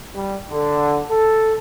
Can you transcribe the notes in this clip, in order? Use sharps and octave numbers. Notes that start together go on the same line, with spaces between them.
G3
D3
A4